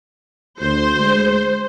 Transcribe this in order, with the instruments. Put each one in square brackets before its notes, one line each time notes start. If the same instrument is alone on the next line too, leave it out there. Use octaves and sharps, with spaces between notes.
[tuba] D2 [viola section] C5
[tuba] G#3